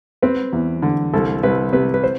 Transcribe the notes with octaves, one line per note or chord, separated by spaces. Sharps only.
C4 B4
E2
D3
C2 A4
C2 B4
C3 B4
B4
C5